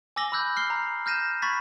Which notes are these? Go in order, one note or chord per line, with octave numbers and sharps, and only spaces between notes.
G#5 D6 E6 A#6 F#7 G7
B5 D6 E6 F#6 G6
F6 C7 G7
A#5
F6 G6 A#6 D#7 E7
B5 C#6 F#6 G#6 A6 B6